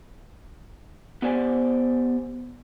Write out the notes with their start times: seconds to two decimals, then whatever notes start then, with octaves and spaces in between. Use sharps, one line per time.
1.22 B3 G4 C5 D5 G#5